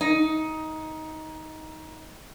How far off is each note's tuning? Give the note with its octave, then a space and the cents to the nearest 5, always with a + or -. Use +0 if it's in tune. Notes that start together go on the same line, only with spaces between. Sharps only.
D#4 +15